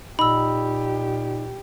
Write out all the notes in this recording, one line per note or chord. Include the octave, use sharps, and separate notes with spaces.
A#2 D#4 G4 D#5 B5 E6